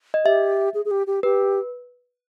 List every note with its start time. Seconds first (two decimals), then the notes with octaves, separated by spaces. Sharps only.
0.14 D#5
0.25 G4 E5
0.74 G#4
0.85 G#4
0.91 G4
1.07 G4
1.23 G4 B4